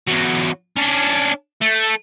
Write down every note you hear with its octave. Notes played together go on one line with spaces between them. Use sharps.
E2 F#3
C#4 D4
A3